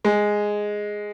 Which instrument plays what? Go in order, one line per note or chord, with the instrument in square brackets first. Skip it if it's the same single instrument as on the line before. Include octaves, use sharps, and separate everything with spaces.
[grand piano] G#3